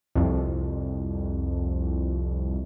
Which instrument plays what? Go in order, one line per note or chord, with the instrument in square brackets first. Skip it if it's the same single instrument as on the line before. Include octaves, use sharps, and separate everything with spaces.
[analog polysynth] C2 F2